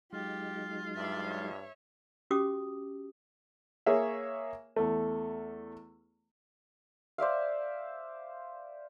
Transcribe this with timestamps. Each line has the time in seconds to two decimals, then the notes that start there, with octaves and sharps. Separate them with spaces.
0.13 F#3 G#3 D#4 F4 G4
0.96 G2 D5 E5
1.27 C#5 E5
2.31 C#4 F#4 G4 D6 D#6
3.86 A#3 G#4 C#5 E5
4.76 E2 A3
7.18 C5 D5 E5 F5